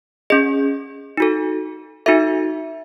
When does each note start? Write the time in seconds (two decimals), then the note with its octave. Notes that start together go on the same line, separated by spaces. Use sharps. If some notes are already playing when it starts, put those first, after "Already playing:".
0.30 C#4 G#4 D#5
1.17 D#4 F#4 A4
2.06 D#4 F#4 A4 E5